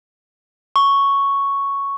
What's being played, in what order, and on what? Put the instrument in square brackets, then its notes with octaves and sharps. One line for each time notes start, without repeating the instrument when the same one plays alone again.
[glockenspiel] C#6